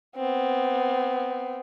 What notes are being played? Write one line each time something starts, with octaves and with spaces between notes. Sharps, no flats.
B3 C4